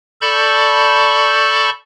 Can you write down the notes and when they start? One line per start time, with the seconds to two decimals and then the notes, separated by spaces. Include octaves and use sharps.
0.22 A4 D5 A5 B5 C#6 G6